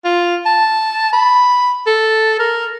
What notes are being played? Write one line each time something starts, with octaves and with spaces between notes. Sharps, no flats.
F4
A5
B5
A4
A#4